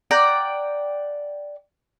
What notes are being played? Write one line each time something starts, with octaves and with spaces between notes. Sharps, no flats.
D5 F#5 G5 A#5